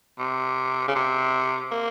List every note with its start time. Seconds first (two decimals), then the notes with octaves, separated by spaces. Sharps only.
0.19 C3
0.88 C#3
0.95 C3
1.72 A#3